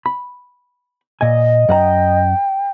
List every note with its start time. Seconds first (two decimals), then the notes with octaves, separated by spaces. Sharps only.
0.06 B5
1.21 A#2 D#5 G#5
1.69 F#2 F#5 G5 A#5